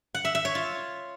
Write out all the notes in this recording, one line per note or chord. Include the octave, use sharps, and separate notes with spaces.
F#5
E5
E5
C#5
F4